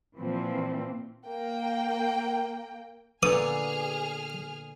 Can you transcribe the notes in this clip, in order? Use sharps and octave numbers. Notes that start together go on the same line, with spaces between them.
A#2 E3 F3 C4
A#3 G5
A#2 D3 B3 G#4 B4 G#5 D#6 F6